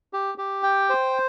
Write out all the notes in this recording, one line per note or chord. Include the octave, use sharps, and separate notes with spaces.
G4
G4
G5
C5